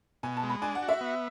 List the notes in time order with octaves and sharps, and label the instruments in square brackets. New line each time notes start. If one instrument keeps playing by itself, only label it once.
[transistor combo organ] B2 [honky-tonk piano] G#5
[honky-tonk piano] A5
[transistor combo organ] G#3
[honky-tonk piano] B5
[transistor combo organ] D4 [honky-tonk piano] G#5
[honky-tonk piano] F#5
[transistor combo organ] F#4
[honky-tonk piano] E5
[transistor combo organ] B3